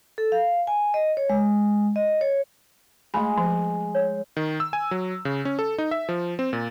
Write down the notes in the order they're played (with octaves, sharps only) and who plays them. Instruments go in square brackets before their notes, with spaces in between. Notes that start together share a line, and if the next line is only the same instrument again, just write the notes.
[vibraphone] A4
F5
G#5
D#5
C#5
G#3
D#5
C#5
[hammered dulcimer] G#3 [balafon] A3 B5
[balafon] F3
[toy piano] C#5
[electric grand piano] D#3
E6
G#5
F#3
C#3
C#4
A4
D#4
E5
F3
C4
A#2